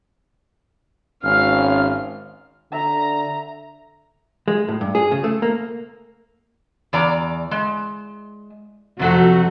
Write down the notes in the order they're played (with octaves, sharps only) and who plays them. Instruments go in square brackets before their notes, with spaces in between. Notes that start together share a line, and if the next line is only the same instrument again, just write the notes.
[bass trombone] G#1 [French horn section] C#4 [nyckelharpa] F5 [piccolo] F6
[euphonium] D3 [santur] E5 [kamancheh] A#5
[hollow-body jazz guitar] G#3
A2
G2
G#4
C#3
A3
A#3
[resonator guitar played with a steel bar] E2 D5 A#5
G#3
[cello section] F2 F#4 [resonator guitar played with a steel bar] C3 F#3 A3